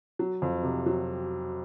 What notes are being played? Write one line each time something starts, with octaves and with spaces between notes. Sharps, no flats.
F#3
F2
C3
F#3